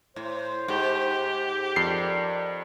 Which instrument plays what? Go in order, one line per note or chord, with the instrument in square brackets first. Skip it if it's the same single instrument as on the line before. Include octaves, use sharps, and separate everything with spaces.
[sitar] A2 [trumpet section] C5
[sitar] G#2 [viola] G4
[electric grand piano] F2 C7 [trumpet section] A#4 D5